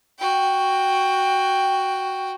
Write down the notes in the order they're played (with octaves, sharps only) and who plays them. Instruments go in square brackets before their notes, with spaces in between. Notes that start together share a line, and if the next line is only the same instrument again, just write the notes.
[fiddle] F#4 G5